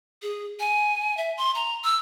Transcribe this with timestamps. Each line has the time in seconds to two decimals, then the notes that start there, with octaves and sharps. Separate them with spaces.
0.22 G#4
0.60 G#5
1.17 E5
1.37 C6
1.55 A#5
1.84 E6